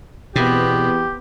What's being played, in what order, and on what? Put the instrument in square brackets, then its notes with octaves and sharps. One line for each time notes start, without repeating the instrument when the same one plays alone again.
[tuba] E2 [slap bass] B2 [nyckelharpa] B3 C4 [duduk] G4